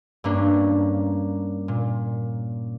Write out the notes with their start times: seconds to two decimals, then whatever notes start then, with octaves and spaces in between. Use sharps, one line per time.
0.24 G2 A#3 C#4 D4
1.68 A#2